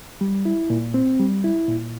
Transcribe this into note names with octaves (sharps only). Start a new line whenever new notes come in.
G3
E4
A#2
C4
G3
E4
A#2